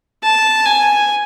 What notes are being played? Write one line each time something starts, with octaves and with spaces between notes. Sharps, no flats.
A5
G#5